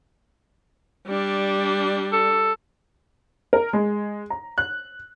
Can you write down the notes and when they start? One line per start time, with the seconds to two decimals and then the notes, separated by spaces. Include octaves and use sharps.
1.07 G3 D4
2.12 A4
3.53 A#4
3.73 G#3
4.30 A#5
4.58 F#6